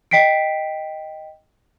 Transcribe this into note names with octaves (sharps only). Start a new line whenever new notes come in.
D#5 G5 B6 C7 D7